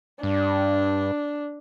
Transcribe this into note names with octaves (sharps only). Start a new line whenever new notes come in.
G2 D4